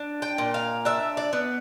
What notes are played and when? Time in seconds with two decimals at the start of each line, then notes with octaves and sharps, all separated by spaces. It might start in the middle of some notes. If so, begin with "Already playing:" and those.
Already playing: D4
0.22 G5
0.38 A#2
0.54 F5
0.85 D4 E5
1.17 D5
1.33 B3